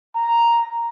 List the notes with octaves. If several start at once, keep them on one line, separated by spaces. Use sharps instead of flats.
A#5